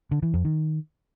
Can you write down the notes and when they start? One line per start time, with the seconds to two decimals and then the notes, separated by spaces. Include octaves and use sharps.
0.11 D3
0.23 E3
0.34 F2
0.45 D#3